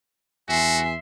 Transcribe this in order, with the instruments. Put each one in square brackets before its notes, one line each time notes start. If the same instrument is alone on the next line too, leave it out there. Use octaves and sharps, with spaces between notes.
[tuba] E2 [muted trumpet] F#4 [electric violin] E5 C6 [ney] G#5